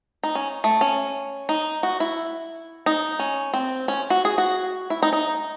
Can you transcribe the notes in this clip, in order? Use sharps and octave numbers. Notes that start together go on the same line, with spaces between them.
D#4
C#4
A3
C#4
D#4
F#4
E4
D#4
C#4
C4
C#4
F#4
G#4
F#4
E4
D#4
D#4